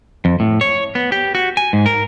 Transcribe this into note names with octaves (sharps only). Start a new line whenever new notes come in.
F2
A2
C#5
B3
G4
F#4
G#5
G#2
A#4